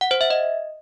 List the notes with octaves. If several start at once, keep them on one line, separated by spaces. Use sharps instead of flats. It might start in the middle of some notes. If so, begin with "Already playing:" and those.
F#5
C5
E5
D#5